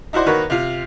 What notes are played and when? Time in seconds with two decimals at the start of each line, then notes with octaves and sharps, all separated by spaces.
0.13 D#4 E4 F#4 C5 D5
0.26 D#3 A#3 F#4 B4 C#5
0.50 C3 F4